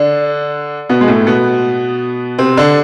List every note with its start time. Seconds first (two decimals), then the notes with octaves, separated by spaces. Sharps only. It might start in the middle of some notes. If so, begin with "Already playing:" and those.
Already playing: D3 D4
0.89 B2 B3
1.01 G#3
1.08 A2 A3
1.27 B2 B3
2.38 C3 C4
2.57 D3 D4